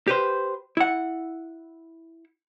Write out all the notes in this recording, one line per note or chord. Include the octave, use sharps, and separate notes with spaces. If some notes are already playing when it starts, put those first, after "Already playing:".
G4 B4 C5
E4 F#5